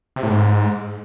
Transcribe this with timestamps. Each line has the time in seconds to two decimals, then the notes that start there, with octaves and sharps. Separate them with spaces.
0.16 C3
0.23 A2
0.30 G#2